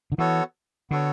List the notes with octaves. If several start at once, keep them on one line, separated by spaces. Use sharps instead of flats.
D3
E3 B3 F#4 A4 C#5
D3 B3 F#4 A4 C#5